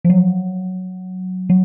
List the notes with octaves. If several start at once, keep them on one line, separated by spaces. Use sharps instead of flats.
F3
F#3
F#3